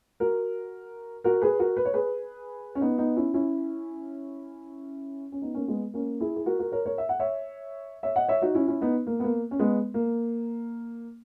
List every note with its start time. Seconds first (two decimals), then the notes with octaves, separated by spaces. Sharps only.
0.20 F#4 A#4
1.24 F#4 A#4
1.42 G#4 B4
1.59 F#4 A#4
1.77 B4
1.85 C#5
1.94 G#4 B4
2.75 C#4
2.81 B3 D#4
2.98 B3 D#4
3.16 C#4 E4
3.34 C#4 E4
5.32 C#4
5.41 B3 D#4
5.55 A#3 C#4
5.68 G#3 B3
5.94 A#3 C#4
6.20 E4 G#4
6.36 G#4
6.46 F#4 A#4
6.59 F#4 A#4
6.72 A#4 C#5
6.85 A#4 C#5
6.98 E5
7.09 F#5
7.20 C#5 E5
8.03 C#5 E5
8.16 D#5 F#5
8.28 C#5 E5
8.42 D#4 F#4
8.55 C#4 E4
8.68 C#4 E4
8.81 B3 D#4
9.07 A#3
9.20 B3
9.24 A#3
9.51 C#4
9.59 G#3 B3
9.94 A#3